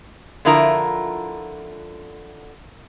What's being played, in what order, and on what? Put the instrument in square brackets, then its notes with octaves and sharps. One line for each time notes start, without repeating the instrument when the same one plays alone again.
[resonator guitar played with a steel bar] D3 F3 E4 F4 A#4 A#5